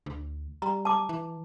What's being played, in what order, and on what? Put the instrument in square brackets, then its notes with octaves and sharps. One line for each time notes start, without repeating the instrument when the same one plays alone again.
[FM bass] D2
[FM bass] G3 [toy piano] A#5
[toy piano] A5 D6
[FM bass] E3